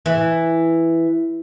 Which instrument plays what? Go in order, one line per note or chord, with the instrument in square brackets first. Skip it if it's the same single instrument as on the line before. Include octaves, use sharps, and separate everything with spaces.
[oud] E3